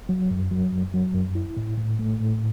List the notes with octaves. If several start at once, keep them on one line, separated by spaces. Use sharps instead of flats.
F#3
F#2
F#3
F#2
F#3
F#2
E4
A2
A2
A3
A2